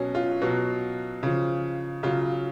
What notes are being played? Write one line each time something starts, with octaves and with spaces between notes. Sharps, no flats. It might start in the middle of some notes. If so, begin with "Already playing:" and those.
Already playing: B2 F#3 C#4
F4
B2 F#3
C#3 F3
C#3 F#3 F4